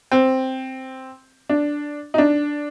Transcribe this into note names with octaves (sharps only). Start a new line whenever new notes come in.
C4
D4
D#4
D4